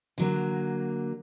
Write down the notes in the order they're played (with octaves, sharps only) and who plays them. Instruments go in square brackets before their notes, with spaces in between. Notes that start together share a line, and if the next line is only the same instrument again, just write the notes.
[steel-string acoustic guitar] D3 F#3 A#3